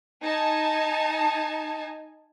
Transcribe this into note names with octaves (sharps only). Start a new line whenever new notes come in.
D#4 G#5 A5